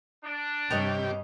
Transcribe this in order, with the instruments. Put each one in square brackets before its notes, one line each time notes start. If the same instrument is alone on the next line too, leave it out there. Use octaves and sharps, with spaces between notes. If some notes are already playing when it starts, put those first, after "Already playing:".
[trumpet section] D4
[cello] G2 [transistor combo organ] C3 G4 [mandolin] C#5 D#5